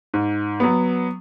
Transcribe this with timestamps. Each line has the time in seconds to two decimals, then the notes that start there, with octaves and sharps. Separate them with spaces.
0.14 G#2
0.60 F#3 B3